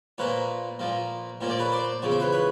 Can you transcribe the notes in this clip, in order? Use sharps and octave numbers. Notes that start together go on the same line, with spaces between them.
A#2 F3 A#3 B4 C#5
A#2 F3 A#3
A#2 F3 A#3 C#5
D5
B4 C#5
C5 D5
E2 C#3 F3 C#5
C5
B4 C#5
B4 C#5